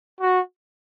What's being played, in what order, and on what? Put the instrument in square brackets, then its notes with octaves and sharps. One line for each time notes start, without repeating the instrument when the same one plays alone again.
[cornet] F#4